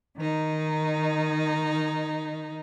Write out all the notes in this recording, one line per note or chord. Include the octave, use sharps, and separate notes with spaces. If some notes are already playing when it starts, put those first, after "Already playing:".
D#3 D#4